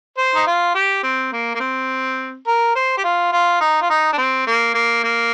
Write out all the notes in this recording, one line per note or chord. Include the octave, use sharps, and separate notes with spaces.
C5
D#4
F4
G4
C4
A#3
A#3
C4
A#4
C5
G4
F4
F4
D#4
F4
D#4
D4
C4
A#3
A#3
A#3